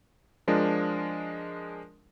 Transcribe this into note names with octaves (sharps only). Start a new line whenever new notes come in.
F3 G#3 D4 A#4